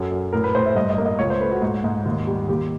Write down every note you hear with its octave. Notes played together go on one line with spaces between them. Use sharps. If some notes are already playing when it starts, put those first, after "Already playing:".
Already playing: F#2 A4
F#2
A2 A#4
B4
A2 C5
E5
G2 D#5
D#5
A#3
D#5
C#2 C#5
C5
A3 B4
F#4
G#2
G#2
D#2
G3
D#2 G4